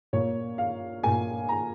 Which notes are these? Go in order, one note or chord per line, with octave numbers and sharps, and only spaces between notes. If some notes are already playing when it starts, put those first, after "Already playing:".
A#2 A#3 C#5
F5
A#2 A#3 G#5
A#5